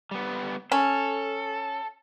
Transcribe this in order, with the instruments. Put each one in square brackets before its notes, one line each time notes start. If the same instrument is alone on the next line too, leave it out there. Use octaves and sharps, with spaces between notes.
[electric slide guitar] G3 B3
[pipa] C#4 [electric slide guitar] A4